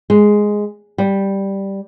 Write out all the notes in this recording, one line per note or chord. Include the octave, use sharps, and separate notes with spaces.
G#3
G3